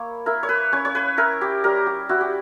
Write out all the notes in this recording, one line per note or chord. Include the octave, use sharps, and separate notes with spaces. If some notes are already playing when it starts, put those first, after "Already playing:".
Already playing: A#3 E4 C#5
E4 A#4
C#5
B4
C#4 C#5
C#5
B4
E4 A#4
G4
G3 A#4
G4
E4 F#4
G4